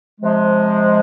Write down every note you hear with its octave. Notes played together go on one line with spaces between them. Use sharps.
C3 F3 G#3